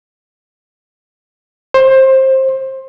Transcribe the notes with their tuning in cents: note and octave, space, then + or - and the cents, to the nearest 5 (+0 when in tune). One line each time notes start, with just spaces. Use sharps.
C5 +20